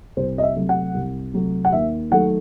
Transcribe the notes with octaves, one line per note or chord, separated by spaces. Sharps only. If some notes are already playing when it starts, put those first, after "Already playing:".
C2 C5
D#5
E5
C3 F#3 A3
F#5
C2
C3 F#3 A3
F#5
D#2 E5
D#3 F#3 A3 F#5